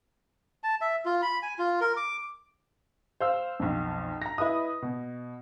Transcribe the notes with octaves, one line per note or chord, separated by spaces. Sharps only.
A5
E5
F4
B5
G#5
F4
A#4
D6
C5 F5 E6
B1 F2
A#5 A#6
E4 B4 D#5 D#6
B2